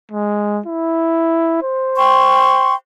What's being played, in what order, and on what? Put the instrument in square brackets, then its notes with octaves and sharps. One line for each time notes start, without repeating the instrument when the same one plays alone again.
[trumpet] G#3
E4
C5
[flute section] G5 C6 C#6